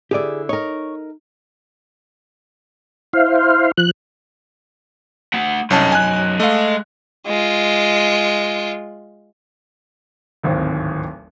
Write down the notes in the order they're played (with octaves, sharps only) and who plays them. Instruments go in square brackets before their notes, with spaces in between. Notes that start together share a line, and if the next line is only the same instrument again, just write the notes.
[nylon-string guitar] D3 E4 [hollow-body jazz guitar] G4 G#4 D5
[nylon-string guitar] D#4 A#4 [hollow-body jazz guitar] C#5
[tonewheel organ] E4 C5 F5
F3 F#6
[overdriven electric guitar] A3 F#5
[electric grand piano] C2 C#4 A5 [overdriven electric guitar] F#2 D#4
[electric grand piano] G#5 F#6
[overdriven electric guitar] G#3 D#5 [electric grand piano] A3 F5
[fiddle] G#3 F4
[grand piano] D1 G#1 D#2 C4